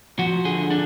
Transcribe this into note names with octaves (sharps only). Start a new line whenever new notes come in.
F3 F#4
D3 G#4
D4